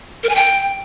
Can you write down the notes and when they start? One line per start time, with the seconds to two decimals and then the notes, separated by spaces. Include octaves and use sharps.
0.23 A#4
0.29 G#5
0.35 G5